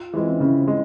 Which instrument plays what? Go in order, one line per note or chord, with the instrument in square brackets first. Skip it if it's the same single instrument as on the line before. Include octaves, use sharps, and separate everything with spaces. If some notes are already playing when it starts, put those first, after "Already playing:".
Already playing: [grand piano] F4
[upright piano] E3 G#3 [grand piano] C4
[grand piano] C#4
[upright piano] C#3 [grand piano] E4
[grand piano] C4
[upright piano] G#3